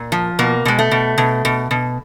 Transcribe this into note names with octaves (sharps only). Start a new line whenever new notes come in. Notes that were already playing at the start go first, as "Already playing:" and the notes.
Already playing: A#2
F3
B2 A#3
B2 G#3
A3
B2
B2
B2
B2